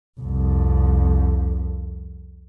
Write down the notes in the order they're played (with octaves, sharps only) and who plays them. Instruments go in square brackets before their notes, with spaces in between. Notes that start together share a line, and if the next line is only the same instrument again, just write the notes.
[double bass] C2 F2